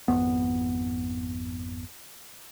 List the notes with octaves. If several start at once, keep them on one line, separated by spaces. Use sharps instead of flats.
G#1 F2 B3